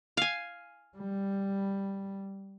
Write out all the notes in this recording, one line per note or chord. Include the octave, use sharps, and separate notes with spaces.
F5 G#5
G3